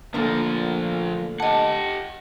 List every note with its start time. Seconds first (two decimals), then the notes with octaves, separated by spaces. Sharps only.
0.14 D2 A#2 D3 F3 A#3
1.40 G4 D#5 F#5 A5